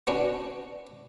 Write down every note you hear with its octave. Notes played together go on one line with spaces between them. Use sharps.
B3 C#4 D4 F#4